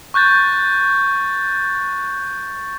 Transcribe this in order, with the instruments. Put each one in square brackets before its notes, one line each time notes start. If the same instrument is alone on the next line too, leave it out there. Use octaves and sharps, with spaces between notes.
[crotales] C#6 F#6 G6 A6